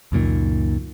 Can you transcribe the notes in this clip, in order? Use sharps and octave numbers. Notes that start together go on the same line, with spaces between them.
C#2 F#2 A#2 D#3